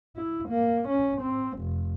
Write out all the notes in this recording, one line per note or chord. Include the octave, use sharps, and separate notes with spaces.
E4
A#3
C#4
C4
F1